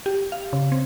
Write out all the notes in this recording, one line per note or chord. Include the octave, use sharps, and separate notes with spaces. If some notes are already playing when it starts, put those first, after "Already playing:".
G4
F5
C#3
C4